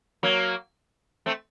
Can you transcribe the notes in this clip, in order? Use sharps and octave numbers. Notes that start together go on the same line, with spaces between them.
F#3 A#3
A3 C4